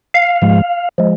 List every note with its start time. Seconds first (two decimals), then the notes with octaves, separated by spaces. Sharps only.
0.14 F5
0.42 G#2 F3 G#3
0.98 F3 G#3